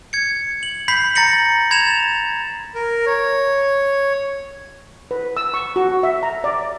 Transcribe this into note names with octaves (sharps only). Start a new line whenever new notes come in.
G#6 C#7
F#7
B5 G6 B6 C7 F#7
A#5 A6 A#6 C#7 F#7
B5 G#6 A6 E7 F7
A#4
C#5
B4
E6
C#6
F#4
E5
A#5
D5